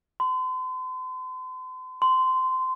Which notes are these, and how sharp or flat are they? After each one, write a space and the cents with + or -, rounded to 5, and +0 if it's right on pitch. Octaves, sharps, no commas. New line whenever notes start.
C6 -40
C6 -20